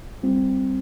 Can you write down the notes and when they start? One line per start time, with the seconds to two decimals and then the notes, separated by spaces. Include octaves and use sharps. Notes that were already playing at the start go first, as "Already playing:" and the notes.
0.23 G3 C4 F4